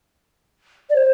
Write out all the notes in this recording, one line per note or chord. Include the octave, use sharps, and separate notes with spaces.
D5
C5